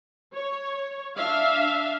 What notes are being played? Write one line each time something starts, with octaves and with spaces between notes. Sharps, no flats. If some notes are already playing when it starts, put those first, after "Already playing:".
C#5
D4 E5 F5